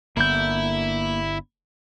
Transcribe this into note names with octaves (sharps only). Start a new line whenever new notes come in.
G1 D3 A#3 B3 E4 G6